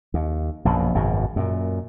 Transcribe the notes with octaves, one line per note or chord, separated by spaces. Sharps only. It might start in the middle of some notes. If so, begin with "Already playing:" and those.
D#2
A#1 F#2 B2
G#1 F#2 B2
F#2 A#2